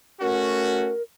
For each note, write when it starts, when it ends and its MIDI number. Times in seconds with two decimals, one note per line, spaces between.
0.21 0.92 57
0.21 0.92 61
0.21 0.92 66
0.21 1.02 70